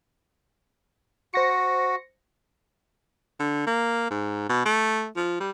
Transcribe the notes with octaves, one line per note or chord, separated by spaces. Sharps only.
F#4 C5 A#6 C#7
D3
A#3
G#2
B2
A3
F3
G3